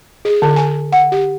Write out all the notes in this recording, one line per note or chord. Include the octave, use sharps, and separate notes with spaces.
G#4
D3
G#5
F#5
G4